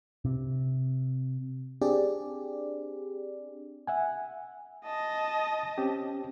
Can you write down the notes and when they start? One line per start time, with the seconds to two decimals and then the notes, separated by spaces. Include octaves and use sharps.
0.25 C3
1.81 C4 D4 G4 G#4 D5
3.87 E5 F#5 G#5
4.85 D#5 A5
5.78 C4 C#4 G4